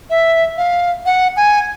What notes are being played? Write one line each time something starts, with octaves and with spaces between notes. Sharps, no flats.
E5
F5
F#5
G#5